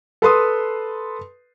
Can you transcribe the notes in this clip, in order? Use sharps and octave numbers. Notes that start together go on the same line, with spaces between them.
A4 B4 C6 D#6